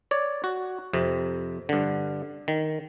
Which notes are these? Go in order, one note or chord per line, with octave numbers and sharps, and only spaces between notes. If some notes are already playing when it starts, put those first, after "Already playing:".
C#5 D5
F#4
F2 C3
G2 D3
D#3